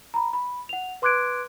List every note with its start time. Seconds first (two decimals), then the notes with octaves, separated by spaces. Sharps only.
0.14 A#5 B5
0.33 B5
0.69 F#5 F7
1.02 B4 C6 D6 F#6 G#6 D7